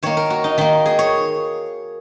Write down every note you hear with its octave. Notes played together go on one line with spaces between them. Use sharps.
D#3 A#3 C#5
A#4
F#4
D#4
D#3 A#3 D#4
G#4
C#5